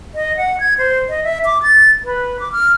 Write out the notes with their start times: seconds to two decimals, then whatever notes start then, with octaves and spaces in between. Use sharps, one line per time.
0.15 D#5
0.37 F#5
0.60 G#6
0.78 C5
1.09 D#5
1.24 E5
1.45 D6
1.63 A6
2.04 B4
2.40 D6
2.52 F6